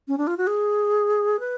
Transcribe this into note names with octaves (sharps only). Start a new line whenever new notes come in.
C#4
D4
F4
F#4
G#4
B4